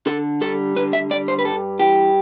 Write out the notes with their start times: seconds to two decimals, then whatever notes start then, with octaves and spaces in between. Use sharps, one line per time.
0.07 D3 A4
0.41 G3 A4
0.76 D3 B4
0.93 E5
1.10 G3 D5
1.28 C5
1.39 B4
1.45 G2 A4
1.79 E3 G4